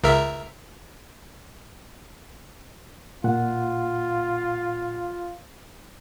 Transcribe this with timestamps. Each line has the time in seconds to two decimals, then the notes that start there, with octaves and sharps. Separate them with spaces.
0.04 C#2 A#4 E5
3.24 A#2 F4 F#5